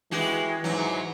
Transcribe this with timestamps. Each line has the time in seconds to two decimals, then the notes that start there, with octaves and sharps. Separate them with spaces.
0.11 E3 G#3 F#4 G4
0.64 G#2 E3 F#3